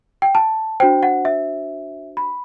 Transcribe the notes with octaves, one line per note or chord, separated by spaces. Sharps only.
G5
A5
D4 F#4 C5 G5
F#5
E5
B5